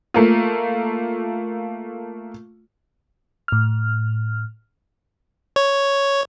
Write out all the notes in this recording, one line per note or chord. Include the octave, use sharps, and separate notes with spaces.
A3 A#3 F4
A2 F6
C#5